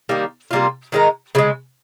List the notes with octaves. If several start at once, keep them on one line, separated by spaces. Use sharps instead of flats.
D#3 G3 A#3
C3 G3 A#3 F4
D#3 G#3 D#4 A#4
C#3 F3 G#3